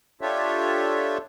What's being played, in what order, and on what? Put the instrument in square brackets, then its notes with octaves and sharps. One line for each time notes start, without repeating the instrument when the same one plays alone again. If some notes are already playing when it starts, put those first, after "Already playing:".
[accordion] D4 F4 G4 A4 C#5 E5